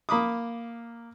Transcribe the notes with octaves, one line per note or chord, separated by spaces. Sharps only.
A#3 B5 D6 D#6